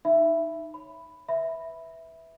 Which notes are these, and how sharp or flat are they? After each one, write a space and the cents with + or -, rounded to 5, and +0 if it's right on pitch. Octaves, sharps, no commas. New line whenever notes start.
D#4 -5 E5 +15 B5 +0
C#5 +5 B5 +5
B4 +0 E5 -5 B5 +0